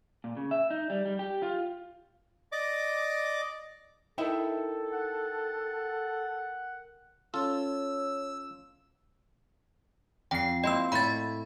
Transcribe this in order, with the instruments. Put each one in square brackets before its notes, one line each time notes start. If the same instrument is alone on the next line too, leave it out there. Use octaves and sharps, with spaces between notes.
[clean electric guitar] A#2
C#3
E5
D#4
G3
G3
G4
F4
[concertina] D5 D#5 D6
[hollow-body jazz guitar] D#4 E4 E5 [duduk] A4 [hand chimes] A#4 G5
[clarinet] F#5
[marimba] C#4 [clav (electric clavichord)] F4 A4 [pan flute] C#5 [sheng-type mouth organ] E6
[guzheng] F2 [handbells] G5 C7
[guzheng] A#3 E4 C5 [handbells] D#5 E6
[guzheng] A2 E4 [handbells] B5 A6